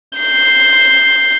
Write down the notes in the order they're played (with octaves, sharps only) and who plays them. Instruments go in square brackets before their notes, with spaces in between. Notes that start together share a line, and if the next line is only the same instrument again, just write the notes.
[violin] G6 C7